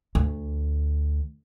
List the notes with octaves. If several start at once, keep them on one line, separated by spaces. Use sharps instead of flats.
D2